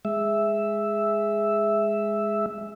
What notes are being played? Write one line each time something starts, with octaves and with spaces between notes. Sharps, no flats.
G#3 E5